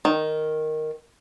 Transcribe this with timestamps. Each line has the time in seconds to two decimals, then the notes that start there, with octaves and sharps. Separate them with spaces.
0.05 D#3